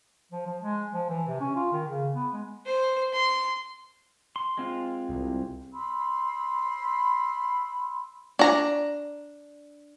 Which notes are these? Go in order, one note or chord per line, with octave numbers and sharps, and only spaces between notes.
F3
F3
G#3
F3
E3
C3
C#4
F4
D#3
C#3
B3
G#3
C5
C6
C6
G#3 C4 F4
C2
B5 C6 E6
D4 A#5